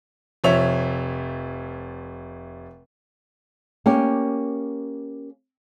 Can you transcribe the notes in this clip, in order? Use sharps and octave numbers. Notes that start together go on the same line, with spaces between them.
F1 F3 C#5 E5 F7
A#3 C#4 G4